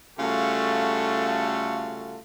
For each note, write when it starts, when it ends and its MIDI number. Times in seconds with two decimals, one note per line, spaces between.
0.19 2.18 49
0.19 2.18 55
0.19 2.18 57
0.19 2.18 65
0.19 2.18 66
0.19 2.18 69